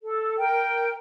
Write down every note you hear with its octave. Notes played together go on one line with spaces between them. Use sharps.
A4
A#4 G5